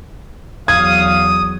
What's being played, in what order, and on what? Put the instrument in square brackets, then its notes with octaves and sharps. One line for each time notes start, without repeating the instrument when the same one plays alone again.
[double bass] E2 F#3 [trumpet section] F5 [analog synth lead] D#6 [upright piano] G#6